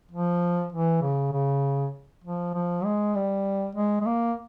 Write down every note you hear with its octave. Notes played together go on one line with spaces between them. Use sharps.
F3
E3
C#3
C#3
F3
F3
G#3
G3
G#3
G#3
A#3